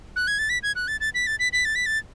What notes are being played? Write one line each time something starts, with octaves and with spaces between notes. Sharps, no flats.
F#6
G#6
A6
B6
G#6
F#6
A6
A6
B6
A6
B6
B6
A6
B6
A6